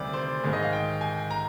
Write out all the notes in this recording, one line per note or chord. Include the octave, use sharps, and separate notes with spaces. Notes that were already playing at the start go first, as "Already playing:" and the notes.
Already playing: D2 C3 D#3 G3 D5
C5
G#2 D#3 G#3
D#5
F5
G5
G#5
A#5